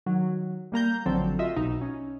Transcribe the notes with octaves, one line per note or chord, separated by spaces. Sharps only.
D#3 F#3
G3 A#3 A#5 G6
A1 D3 F3 F#3 C4 A4
F4 F#4 D#5 E5
B1 B2 D#4
C#4